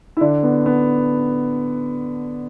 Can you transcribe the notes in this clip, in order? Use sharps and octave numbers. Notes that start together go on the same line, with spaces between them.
E4
D3 D4
B3
B3